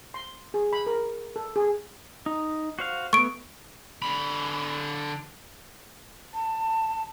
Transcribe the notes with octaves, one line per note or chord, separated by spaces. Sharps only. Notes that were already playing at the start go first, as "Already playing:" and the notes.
C6
G#4
B5
A#4
A4
G#4
D#4
F#4 C5 F5
A3 B3 C#6 D7
D3 B5
A5